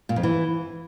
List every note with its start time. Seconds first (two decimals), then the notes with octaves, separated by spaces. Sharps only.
0.09 A#2
0.16 F2
0.23 E3